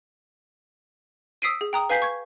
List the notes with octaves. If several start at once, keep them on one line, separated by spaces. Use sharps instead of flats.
D#6 E6 B6 C7 D7 D#7
G#4
G5 A#5 D#6
B4 F5 G#5 G6 B6 C7
C#6 G#6